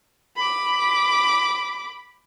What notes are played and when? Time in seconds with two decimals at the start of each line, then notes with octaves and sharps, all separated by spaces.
0.37 B5 D6